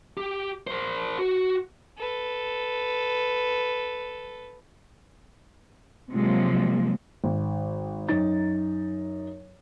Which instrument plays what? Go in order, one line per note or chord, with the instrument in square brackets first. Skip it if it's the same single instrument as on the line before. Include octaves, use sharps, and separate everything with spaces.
[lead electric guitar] G4
A#4 C5
F#4
[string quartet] A4 B4
[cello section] C3 F3 F#3 G#3 A#3
[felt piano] G#1
F#2 D#4 A6